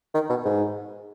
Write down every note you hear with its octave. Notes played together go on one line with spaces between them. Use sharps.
D#3
B2
G#2